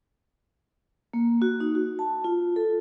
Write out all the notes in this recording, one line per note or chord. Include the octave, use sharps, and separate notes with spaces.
A#3
F#4
D#4
F#4
A5
F4
A4